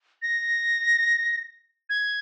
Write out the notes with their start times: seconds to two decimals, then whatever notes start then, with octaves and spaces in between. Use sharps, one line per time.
0.22 A#6
1.90 G#6